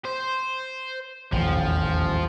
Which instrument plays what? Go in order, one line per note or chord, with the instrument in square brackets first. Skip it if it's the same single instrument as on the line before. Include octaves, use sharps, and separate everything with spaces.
[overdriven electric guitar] C5
[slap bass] D#1 A1 E2 [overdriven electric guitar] F3